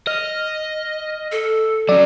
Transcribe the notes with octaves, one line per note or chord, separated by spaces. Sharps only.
D#5 F6
A4
F#3 C#4 D5